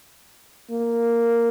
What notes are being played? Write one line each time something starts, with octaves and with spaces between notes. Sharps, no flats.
A#3